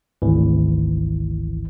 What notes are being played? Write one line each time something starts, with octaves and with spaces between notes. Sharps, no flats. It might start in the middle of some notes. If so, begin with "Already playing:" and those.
G#1 D2 E3